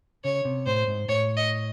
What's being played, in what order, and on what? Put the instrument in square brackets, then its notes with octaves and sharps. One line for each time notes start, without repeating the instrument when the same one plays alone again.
[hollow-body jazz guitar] C#3 [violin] C#5
[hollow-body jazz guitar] C3
[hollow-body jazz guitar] A2 [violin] C5
[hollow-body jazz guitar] G#2
[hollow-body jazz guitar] A2 [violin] C#5
[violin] D#5